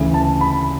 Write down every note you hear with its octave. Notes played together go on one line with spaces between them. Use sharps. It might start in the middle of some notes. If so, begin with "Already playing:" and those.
Already playing: D2 C#3 E3
A5
B5